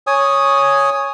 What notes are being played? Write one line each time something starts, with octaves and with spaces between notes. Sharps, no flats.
C#5 G#5 D#6